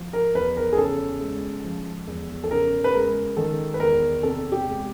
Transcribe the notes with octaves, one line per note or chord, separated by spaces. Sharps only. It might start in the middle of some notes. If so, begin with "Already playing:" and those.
Already playing: F3
A#4
E2 B4
A#4
G#4
C#3 A4
G#3
F3
E2
A4
C#3 A#4
B4
G#3 A#4
D#3 A4
B4
E2 A#4
C3 A4
G4
G#3